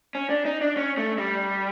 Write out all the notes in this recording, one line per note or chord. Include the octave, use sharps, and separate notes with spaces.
C#4
D4
D#4
D4
C#4
A3
G3